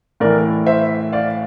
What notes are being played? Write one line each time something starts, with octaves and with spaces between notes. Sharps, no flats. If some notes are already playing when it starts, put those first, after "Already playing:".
A2 E3 A#4 D5
C5 E5
D5 F5